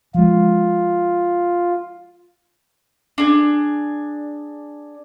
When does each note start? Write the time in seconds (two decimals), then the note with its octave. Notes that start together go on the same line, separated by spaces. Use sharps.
0.14 F3 G#3 F4
3.18 D4 G#4